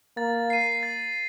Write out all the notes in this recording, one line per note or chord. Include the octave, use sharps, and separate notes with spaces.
A#3 A6
C7 D#7
A6